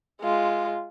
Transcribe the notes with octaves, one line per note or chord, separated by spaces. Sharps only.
G#3 F4